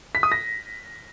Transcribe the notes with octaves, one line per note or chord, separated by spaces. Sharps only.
B6
D#6
A#6